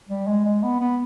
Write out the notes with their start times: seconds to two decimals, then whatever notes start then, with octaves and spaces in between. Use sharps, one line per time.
0.10 G3
0.28 G#3
0.45 G#3
0.63 B3
0.80 B3